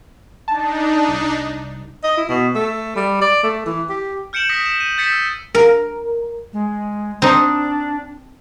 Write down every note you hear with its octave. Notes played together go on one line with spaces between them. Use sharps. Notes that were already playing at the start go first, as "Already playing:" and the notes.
D4 D#4 A5
C2
D#5
E4
B2
A3
G3
D5
A3
E3
G4
F6 G6 C#7 D7 E7 F#7
D#6 A#6 B6 C#7 D7
E7
D#7
G6 A6 B6 C#7 E7
E6
A#4
G#3
C4 D4 D#4